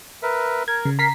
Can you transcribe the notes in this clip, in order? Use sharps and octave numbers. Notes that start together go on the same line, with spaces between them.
A#4 B4 E5
A#4 G#6
C#3
A#4 A#5 B6 C7